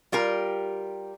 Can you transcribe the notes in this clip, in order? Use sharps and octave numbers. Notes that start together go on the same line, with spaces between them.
G3 F4 G4 A#4